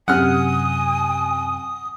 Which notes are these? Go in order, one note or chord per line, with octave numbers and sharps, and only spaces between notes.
F#2 C3 F#5 G#5 D#6 F6